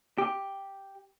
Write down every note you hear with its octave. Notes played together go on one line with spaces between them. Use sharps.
G4